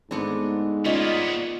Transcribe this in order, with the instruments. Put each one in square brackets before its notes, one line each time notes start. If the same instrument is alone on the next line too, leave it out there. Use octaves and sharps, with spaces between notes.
[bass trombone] G#2 [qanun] A3 B3 D4 [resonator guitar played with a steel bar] C4
[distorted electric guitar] A#3 B3 [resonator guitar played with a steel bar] C#4 D5 D#5 [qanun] F4 C5